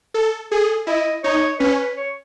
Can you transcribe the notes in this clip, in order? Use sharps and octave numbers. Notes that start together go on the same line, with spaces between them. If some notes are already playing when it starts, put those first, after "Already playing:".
A4
G#4 A4
E4 D#5
D#4 C#5
C#4 B4
B4
C#5